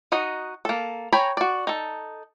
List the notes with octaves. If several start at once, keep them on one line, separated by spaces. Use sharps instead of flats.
D#4 F#4 D#5
A#3 A4
C#5 G5 G#5 A#5 B5
F#4 D5
D#4 A4